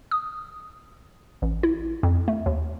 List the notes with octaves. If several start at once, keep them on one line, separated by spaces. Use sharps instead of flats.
D#6
A1
E4
F2
A3
D#2